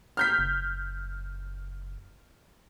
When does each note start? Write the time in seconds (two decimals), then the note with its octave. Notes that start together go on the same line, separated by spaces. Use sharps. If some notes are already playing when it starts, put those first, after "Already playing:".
0.17 F6 G6 B6
0.39 F#1